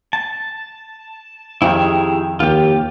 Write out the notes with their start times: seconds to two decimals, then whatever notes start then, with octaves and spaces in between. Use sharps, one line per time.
0.13 A5
1.62 F2 D#3 E4 G4 G#4
2.40 D#2 F4 G4